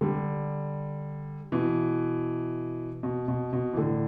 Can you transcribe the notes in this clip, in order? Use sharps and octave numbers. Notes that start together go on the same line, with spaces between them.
D3 G3
B2 E3
B2
B2
B2
E3
A2 D3